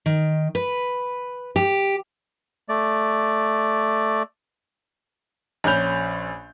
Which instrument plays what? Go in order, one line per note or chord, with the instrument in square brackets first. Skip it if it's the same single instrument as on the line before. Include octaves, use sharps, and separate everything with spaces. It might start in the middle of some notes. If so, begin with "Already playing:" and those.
[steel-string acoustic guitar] D#3
B4
G4
[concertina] A3 D5
[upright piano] A#1 C#4 B5 G6 F7